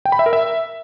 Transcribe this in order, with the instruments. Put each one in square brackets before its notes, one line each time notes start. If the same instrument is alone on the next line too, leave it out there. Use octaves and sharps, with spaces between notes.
[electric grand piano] G5
B5
E5
A#4
E5